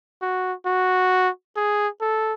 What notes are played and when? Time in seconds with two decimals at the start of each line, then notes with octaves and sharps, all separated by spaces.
0.22 F#4
0.66 F#4
1.56 G#4
2.01 A4